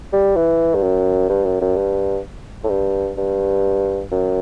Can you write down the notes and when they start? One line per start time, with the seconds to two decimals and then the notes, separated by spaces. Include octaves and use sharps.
0.13 G3
0.36 E3
0.75 G2
0.82 F#2
1.29 G2
1.45 F#2
1.61 F#2
1.77 G2
2.64 A2
2.70 G2
3.18 G2
4.12 F#2